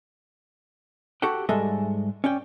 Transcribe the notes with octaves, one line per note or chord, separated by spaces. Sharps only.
F#4 G4 A4 F#5 G5
G#2 G3 G#3 A4 D#5 E5
C#4 D5 G5